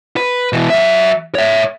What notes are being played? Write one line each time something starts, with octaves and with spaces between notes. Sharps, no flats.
B4
B2 E3
F#3 E5
C#5 E5